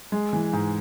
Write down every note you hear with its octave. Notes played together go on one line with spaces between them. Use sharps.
G#3
E3
G#2